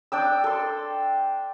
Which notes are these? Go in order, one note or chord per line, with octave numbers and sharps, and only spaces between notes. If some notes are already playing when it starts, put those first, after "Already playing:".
D4 G5 E6
A4 C6